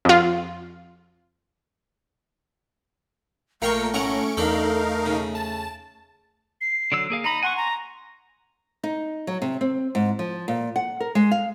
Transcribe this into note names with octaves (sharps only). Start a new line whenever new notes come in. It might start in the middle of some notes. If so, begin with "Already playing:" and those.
F2 F4
A#1 A#2 A3 A#4 F5 G5 C#6 C#7
A2 C#4 F#5 A#5 C#6 D7
E2 D4 D#4 A4 A#4 F5
C#3
A5
C7
D3 F#3 E6
A#3 G#4 F5
D#4 A#5 B5
F#5 G#5 C6 C#6
A#5
D#4
F#3
C3
C4
G#2
F3
A#2
F#5
A#4
G#3
F5